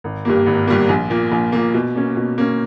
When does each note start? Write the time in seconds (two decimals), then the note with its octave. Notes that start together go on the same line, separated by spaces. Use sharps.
0.04 G#1
0.25 G2 G3 A#3
0.46 G#1
0.67 G2 G3 A#3
0.89 A#1
1.10 A#2 A#3
1.32 A#1
1.52 A#2 A#3
1.74 B2
1.95 A#3 C#4
2.17 B2
2.38 A#3 C#4